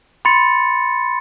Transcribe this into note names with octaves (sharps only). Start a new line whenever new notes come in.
B5 C6 A6 C#7